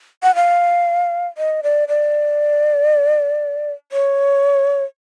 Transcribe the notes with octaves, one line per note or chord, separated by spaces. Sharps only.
F#5
F5
D#5
D5
D5
C#5